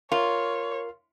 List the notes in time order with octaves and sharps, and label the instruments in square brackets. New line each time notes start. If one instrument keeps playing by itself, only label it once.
[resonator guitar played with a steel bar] F4 [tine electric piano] A#4 [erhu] C#5